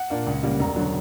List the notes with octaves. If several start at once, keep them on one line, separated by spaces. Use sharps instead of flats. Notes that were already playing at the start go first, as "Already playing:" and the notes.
Already playing: F#5
A#2 A#3 D4
C#2
C#3 G3 A#3
E1 A#5
D3 F#3